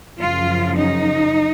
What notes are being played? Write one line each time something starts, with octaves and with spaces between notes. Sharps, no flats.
F#2 C#3 F3 F4
D#4